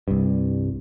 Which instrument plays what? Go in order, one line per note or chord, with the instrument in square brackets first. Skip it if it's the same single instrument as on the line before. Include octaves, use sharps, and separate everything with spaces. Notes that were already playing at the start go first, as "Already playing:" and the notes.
[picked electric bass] C2 G2